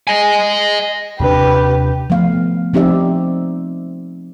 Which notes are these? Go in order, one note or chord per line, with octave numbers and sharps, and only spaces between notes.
D#5 G#5
D#2 C3 D4 G4 B4
F3 A3 B3 F5
F3 C4 D#4 G4 D5 E5